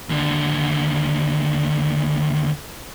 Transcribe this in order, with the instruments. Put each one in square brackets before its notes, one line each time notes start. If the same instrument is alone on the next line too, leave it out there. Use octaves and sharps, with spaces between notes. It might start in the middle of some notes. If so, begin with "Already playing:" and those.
[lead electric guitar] D#2 D3